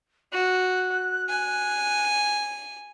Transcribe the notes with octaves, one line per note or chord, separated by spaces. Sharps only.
F#4 F#6
G#5